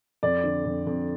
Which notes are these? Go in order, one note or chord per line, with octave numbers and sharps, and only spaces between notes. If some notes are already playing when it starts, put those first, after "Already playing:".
F2 D5
D3
F2
F2